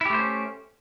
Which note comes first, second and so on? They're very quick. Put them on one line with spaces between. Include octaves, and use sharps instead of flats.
E4 G4 A3 C5 C#4